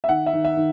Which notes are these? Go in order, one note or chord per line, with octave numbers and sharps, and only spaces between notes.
E5
D#3 F#5
E5
D#3
E5
D#3